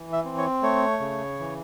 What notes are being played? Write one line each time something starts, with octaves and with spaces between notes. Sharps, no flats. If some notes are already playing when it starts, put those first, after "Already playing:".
Already playing: E3
E5
C4
C#5
A3 C#5
C#3
E3